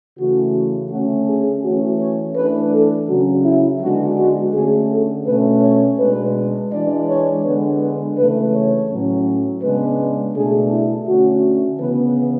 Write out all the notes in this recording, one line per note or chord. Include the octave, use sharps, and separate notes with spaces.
C#3 E3 A3 F#4
D3 A3 C#4 F#4
G#4
E3 A3 C#4 F#4
C#5
E3 A3 D4 B4
A4
C#3 F#3 C#4 F#4
E4
D3 G#3 B3 D4 F#4
F#4
D3 A3 C#4 G#4
A4
B2 A3 C#4 B4
C#5
B2 G#3 D4 B4
E3 G#3 D4 D5
C#5
D3 G#3 B3 D4 B4
B4
C#3 E3 A3 B4
C#5
A2 F#3 C#4
C#3 G#3 B3 D4 B4
B2 A3 D4 G#4
E4
D3 A3 C#4 F#4
C#3 E3 B3 B4